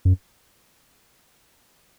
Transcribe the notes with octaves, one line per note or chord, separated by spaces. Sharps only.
F#2